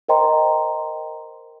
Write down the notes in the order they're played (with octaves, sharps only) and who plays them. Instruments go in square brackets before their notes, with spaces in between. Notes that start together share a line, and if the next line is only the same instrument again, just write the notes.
[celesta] A#4 C5 D#5 G5 A#5 C6